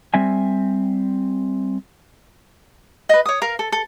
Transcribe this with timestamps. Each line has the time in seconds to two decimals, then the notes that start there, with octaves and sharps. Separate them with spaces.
0.14 G3 C4 E5 G#5
3.09 B4 D#5
3.26 C#5 D#6
3.42 A#4 F5
3.59 A4
3.72 A4